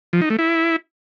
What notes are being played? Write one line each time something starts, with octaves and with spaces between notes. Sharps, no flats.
F3
D#4
A3
E4